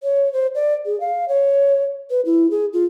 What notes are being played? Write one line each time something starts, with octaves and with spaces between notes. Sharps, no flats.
C#5
C5
D5
G#4
F5
C#5
B4
E4
G#4
F4